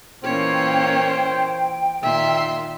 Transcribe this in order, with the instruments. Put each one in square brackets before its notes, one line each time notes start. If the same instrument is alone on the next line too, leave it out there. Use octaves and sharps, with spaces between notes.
[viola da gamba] A#2 E3 A#3 [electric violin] C#4 C#5 [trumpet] C5 [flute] G5
[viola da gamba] A#2 D#3 [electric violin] E5 C6